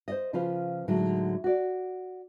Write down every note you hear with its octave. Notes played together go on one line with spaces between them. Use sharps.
C5 D5 D#5
C#3 F3 F4 B4 C5 F5
A2 D3 F#3 G#3 D#4
F#4 D5